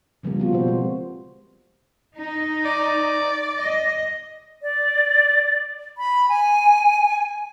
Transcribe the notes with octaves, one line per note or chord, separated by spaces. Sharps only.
C#3 F3 G3 A#3
B3 F4 F#4
B2 C4 C5
G#3
D#4
D5
D#5
D5
B5
G#5